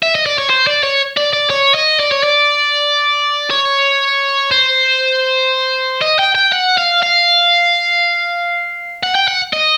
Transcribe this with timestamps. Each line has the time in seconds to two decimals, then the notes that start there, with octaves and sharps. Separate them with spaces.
0.03 E5
0.15 D#5
0.26 D5
0.38 C#5
0.50 C5
0.67 D5
0.83 C#5
1.17 D5
1.33 D5
1.50 C#5
1.75 D#5
2.00 D5
2.12 C#5
2.24 D5
3.51 C#5
4.51 C5
6.02 D#5
6.19 G5
6.35 G5
6.52 F#5
6.78 F5
7.03 F5
9.03 F#5
9.15 G5
9.28 F#5
9.53 D#5